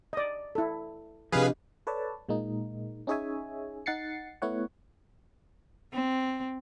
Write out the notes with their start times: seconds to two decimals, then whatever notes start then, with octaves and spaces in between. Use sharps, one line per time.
0.13 D5 D#5
0.55 E4 A4
1.32 C3 F3 D4 G4 G#4 B4 D#5 F5
1.87 A4 B4 C#5 D5 A5
2.29 A#2 G#3 A#3 D#4
3.07 C#4 D#4 G#4 C#5 E5 G#5
3.86 D#4 F#5 A6 C7 C#7
4.42 A3 B3 E4 C#5 F#5
5.93 C4